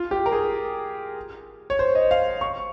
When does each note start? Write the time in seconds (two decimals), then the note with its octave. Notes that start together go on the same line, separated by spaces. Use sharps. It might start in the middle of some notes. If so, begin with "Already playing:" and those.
Already playing: F4
0.11 G4
0.26 A#4
0.32 G#4
1.70 C#5
1.79 C5
1.95 D#5
2.11 F5
2.41 C#6